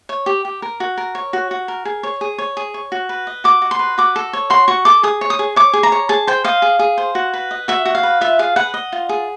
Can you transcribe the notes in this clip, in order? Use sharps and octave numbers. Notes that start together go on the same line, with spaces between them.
C#5
G4
G4
A#4
F#4
A#4
C#5
F#4
F#4
A#4
G#4
C#5
G#4
C#5
G#4
C#5
F#4
B4
D#5
F#4 D6
F#4
C6
B4
F#4 D6
A4
C#5
F#4 C6
F#4 C#6
A4 D6
G#4 D#6
C#5
D#6
G#4
C#5 D6
G#4
A#5
C#5
G#4 A5
C5 G5
D#5 F5
G#4
G#4
C5
F#4
B4
D#5
F#4 E5
F#4
F5
B4
F4 E5
G#4 F5
B4 F#5
D#5
F4
G#4